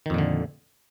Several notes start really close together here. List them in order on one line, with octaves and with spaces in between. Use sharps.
D#3 F2 A#2 D3